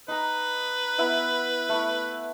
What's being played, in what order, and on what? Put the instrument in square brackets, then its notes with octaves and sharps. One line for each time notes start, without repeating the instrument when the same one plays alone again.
[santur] D#4 A#5 [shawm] B4
[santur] B3 E4 E5
A3 E4